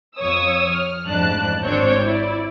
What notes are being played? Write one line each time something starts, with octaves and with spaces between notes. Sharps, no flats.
F2 C#5 D#6 E6
F6
A1 F2 G#2 D4 A5 F#6
G#1 C4 D4 C#5 G6
E4 D5